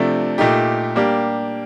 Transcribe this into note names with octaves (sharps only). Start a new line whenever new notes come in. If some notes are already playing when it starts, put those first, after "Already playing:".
Already playing: C3 F3 A3 D4
A#2 A3 D#4 G4
G3 A#3 D4 G4